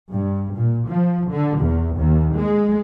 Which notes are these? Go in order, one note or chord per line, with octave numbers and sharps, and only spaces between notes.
G2
A#2
F3
D3
E2
D#2
G#3